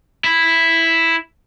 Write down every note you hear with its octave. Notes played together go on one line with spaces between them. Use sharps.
E4